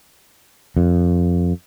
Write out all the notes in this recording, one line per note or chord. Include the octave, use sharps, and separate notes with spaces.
F2